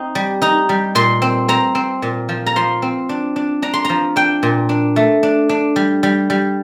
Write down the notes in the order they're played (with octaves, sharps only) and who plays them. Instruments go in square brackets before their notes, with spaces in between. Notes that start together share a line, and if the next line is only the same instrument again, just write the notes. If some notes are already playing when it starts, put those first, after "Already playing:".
Already playing: [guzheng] C4 D#4
G3
D#4 A#5
G3
A#2 C6
C4
C4 A#5
C4
A#2
F3
A#5
F3 C6
C4
D4
D4
D4 A#5
C6
F3 A#5
D4 G5
A#2
D4
A3
D4
D4
G3
G3
G3